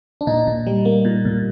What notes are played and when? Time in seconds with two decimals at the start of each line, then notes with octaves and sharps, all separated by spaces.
0.21 D4
0.27 A#2 D#4
0.47 A#2
0.67 G3
0.85 A#3
1.05 A#2
1.25 A#2